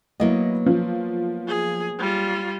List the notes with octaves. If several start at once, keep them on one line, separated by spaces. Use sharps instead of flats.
F#3 A#3 B3 E4 D#5
F3
G#4
G3 F4